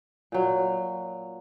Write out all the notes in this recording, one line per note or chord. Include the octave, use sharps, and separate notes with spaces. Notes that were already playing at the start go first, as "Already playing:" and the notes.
A#2 F#3